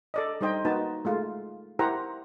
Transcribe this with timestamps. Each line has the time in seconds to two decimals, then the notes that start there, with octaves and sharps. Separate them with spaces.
0.14 A4 D5 D#5
0.41 G3 D#4 C5 D#5 G5
0.65 A#3 D#4 F#4 B4 A5
1.05 G#3 A3 F4
1.79 E4 G4 A#4 C5 F#5 A#5